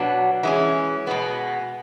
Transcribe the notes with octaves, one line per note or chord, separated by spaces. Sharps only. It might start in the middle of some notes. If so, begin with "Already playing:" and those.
Already playing: B2 F#3 B3 D4
E3 G#3 C#4
B2 G#3 B3